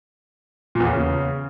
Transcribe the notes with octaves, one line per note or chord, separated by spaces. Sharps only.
A#2
E2
C#3